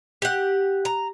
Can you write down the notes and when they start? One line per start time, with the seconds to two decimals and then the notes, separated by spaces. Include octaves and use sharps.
0.22 G4 F#5
0.85 A#5